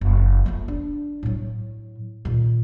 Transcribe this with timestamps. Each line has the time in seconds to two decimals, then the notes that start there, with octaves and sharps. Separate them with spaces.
0.01 F#1
0.46 F3 A3
0.68 D4
1.23 A2 F#3
2.25 A#2 D#3